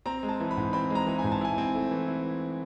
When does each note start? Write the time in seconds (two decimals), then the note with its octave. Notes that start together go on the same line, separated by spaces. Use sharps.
0.06 C4 A#5
0.23 G#3
0.29 A5
0.40 E3
0.51 B5
0.57 G#2
0.73 C4 B5
0.90 G#3 A#5
1.07 E3
1.19 G#5
1.24 G#2
1.32 A5
1.41 E4 G#5
1.58 C4
1.75 A3
1.91 E3
2.08 E4